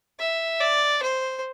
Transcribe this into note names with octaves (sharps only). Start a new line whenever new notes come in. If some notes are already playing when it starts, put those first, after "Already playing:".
E5
D5
C5